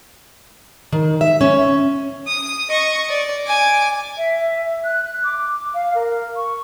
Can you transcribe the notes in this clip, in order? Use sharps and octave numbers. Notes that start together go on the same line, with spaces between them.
D#3
E5
C#4
D#6
D#5 C#6
D5
G#5 D6
E5
F#6
D6
F5
A#4
C#6